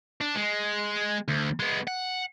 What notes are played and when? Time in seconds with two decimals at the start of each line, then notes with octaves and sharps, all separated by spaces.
0.21 D4
0.35 G#3
1.28 D2
1.60 G#3 B3
1.87 F#5